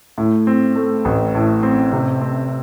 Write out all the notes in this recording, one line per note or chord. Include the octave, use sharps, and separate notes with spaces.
A2
C4
A3
A1
A2
C4
C3
C4